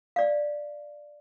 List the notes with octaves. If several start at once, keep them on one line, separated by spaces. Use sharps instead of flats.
D5 F5